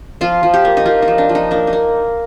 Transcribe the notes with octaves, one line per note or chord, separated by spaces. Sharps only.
F3 F4
F3
G4
A#3
D#4
A#3 F4
D#4
F3
D4
F3
D#4
A#3 D4
D#4
A#3